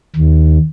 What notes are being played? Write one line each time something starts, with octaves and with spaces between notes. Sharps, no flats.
D#2